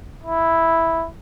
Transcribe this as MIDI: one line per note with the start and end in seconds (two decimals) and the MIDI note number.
0.23 1.06 64